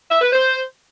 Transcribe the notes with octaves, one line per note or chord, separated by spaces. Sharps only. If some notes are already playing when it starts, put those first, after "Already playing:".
E5
B4
C5